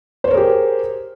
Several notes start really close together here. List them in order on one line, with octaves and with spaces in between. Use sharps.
C5 C#5 A#4 G#4 G4